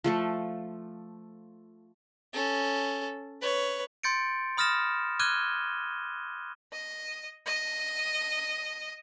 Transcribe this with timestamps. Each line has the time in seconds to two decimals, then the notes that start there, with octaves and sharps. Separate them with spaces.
0.04 F3 A3 A4
2.34 C#4 A4
3.42 B4 C#5
4.03 C6 G6 A6 C#7 D7
4.57 B5 D#6 F6 A6 A#6 E7
5.19 D6 F6 F#6 G#6 D#7 G7
6.72 D#5
7.46 D#5